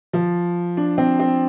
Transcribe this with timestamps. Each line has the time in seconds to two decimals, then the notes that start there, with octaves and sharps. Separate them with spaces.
0.13 F3
0.77 D4
0.98 C4
1.20 C4